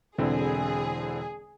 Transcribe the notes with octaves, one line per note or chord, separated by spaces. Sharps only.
E1 D3 C4 E4 G#4